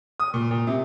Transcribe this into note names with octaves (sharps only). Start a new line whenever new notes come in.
D#6
A#2
A#2
C3